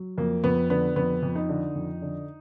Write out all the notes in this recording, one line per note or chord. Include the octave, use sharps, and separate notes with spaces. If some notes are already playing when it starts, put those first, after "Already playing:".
Already playing: F#3
F2 A#3
F2 B3
D3 B3
F2 B3
F2
D#4
D3
F2
D3